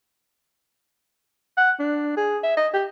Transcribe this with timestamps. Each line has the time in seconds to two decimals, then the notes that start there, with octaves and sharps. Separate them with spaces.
1.58 F#5
1.79 D4
2.17 G#4
2.43 E5
2.57 D#5
2.74 G4